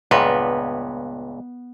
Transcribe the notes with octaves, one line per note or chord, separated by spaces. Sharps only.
C#2 G2 A#2 B3